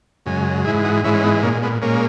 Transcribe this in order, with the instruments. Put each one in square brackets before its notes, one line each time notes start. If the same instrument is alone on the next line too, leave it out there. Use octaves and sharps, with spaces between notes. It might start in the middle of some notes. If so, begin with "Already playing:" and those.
[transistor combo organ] F#2 C#3 G#3
G#2 E3 G#3 E4 G#4
D#4 F#4
G#2 E3 G#3 C#4 E4
C#4
B3 D#4
A#2 G#3 A#3 C#4
G#3 B3
A#2 G#3 A#3 C#4